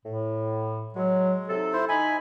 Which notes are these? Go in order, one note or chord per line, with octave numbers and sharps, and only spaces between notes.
A2
F#3 G#3
C3 D#4 A4
E4 C5
D#4 G#5 B5